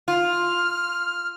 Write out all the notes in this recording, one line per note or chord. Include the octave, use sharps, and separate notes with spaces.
F4 F6